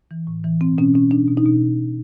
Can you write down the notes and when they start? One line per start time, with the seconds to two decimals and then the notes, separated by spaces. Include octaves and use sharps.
0.11 E3
0.27 A2
0.44 E3
0.61 B2 C4
0.78 B2 C#4
0.94 B2 C#4
1.11 B2 D4
1.28 B2
1.37 D#4
1.46 B2